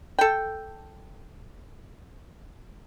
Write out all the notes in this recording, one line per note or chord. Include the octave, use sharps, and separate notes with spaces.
A4 G5